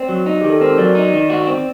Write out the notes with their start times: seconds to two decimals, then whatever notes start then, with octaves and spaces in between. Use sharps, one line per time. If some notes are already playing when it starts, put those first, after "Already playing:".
Already playing: C4 D5
0.09 F#3
0.26 D#4
0.41 D#3 G4
0.50 A4
0.60 C4 A#4
0.69 C5
0.78 F#3 D5
0.95 D#4
1.13 D#3
1.30 F#4
1.47 C4